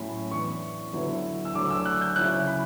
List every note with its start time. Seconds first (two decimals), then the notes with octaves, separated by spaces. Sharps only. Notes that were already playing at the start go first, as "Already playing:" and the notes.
Already playing: A2 F#3 C#4 E4 B5
0.31 E3 B3 D4 C#6
0.93 D3 F#3 B3 E4
1.45 E6
1.54 D3 F#3 A3 D4 D6
1.70 E6
1.86 F#6
2.01 G6
2.16 C#3 F#3 C#4 E4 F#6
2.47 B5